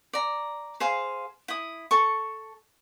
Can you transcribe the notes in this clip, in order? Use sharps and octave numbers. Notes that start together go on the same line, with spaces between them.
D5 A#5
G#4 C5 F5
E4 D#6
A4 C#6